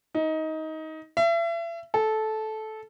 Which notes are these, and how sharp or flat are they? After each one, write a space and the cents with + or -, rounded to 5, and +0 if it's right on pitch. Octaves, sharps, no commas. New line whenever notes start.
D#4 +20
E5 +35
A4 -15